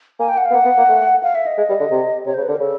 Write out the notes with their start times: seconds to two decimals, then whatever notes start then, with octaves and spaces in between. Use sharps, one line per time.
0.19 A#3 G#5
0.29 G5
0.37 F#5
0.45 F5
0.50 B3
0.54 A#3 F#5
0.65 B3
0.77 A#3
0.89 A3
1.23 F5
1.35 E5
1.46 D#5
1.57 G#3
1.69 G3
1.80 D3
1.91 C3
2.26 C3 C#5
2.34 C5
2.37 C#3
2.42 B4
2.48 D3
2.52 A#4
2.60 C#3 A4